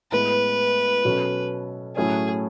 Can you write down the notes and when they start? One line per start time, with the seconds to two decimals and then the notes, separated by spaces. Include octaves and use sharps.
0.12 A2 G#3 B3 B4
1.05 B2 F#3 C#4 F#4 A4
1.96 A2 F#3 A3 C#4 G#4